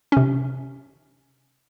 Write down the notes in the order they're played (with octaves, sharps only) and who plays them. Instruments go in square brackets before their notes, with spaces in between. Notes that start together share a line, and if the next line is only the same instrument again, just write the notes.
[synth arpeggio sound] C3 C#4